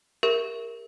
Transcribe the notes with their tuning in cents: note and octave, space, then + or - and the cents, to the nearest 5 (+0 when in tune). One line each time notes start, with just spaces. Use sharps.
G4 +40 A#4 +0 E5 +0